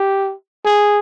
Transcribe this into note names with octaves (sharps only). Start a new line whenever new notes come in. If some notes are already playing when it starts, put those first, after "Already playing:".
Already playing: G4
G#4